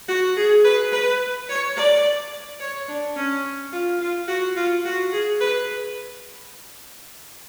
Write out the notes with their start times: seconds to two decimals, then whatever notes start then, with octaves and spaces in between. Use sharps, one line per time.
0.08 F#4
0.36 G#4
0.64 B4
0.92 B4
1.49 C#5
1.76 D5
2.60 C#5
2.88 D4
3.16 C#4
3.73 F4
4.01 F4
4.28 F#4
4.56 F4
4.85 F#4
5.13 G#4
5.40 B4